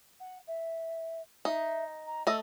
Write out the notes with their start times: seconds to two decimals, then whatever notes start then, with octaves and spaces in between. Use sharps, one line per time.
0.20 F#5
0.47 E5
1.45 D#4 E5
2.06 A#5
2.27 A3 D#5 E6